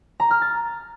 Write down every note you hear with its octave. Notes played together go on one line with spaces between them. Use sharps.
A#5
F6
A6